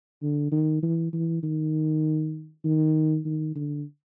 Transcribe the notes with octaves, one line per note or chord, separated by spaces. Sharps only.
D3
D#3
E3
E3
D#3
D#3
D#3
D3